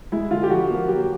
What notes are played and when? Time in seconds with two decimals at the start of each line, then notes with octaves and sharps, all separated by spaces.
0.12 G#3 E4
0.31 D3 F4
0.43 G4
0.50 F3 F#4
0.69 A#3
0.88 F#3 G4